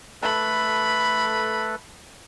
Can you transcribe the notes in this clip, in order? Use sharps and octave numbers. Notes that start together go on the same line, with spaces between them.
A3 A4 B4 B5